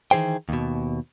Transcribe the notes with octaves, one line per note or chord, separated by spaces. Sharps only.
D#3 E3 G#4 C5 G5
D#2 B2